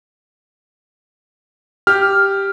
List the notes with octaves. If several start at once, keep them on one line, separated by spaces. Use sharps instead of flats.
G4 F6